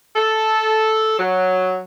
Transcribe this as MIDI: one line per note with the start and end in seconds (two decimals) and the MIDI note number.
0.16 1.16 69
1.19 1.81 54